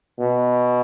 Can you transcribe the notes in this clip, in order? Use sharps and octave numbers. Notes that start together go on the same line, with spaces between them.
B2